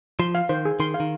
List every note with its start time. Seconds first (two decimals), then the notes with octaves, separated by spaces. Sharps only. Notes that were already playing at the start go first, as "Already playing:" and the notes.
0.19 F3 C6
0.35 F5
0.49 D#3 C5
0.65 G#4
0.80 D#3 C6
0.94 F5
1.00 D#3